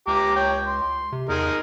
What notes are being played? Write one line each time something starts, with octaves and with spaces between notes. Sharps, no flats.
C#2 G4 A#5 D6
C#5 G5
C6
C3
E2 D#4 G#4 A#4